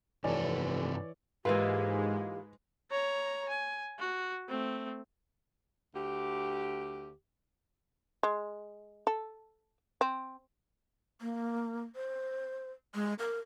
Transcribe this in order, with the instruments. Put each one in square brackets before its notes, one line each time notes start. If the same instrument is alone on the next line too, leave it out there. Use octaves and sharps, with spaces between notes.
[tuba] F1 [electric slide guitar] G2 C3 A4 [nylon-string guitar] E3 [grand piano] C#5 D5 G#5
[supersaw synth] G#2 G#3 [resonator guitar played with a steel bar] E3 A#3 F4 [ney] G4 [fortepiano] B4
[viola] C#5 A#5
G#5
F#4
A3 C4
[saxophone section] D2 G4
[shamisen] G#3
A4
C4
[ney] A#3
C5
G#3
A#4